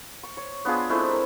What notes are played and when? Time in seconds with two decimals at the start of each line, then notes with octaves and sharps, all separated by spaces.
0.23 C#6
0.37 C#5
0.65 B3 D4 F4 G#4
0.89 G#3 A3 C4 E4
1.10 A#4